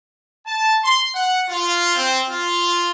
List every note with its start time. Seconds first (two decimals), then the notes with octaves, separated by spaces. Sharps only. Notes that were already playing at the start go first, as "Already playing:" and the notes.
0.46 A5
0.85 C6
1.15 F#5
1.49 F4
1.95 C4
2.28 F4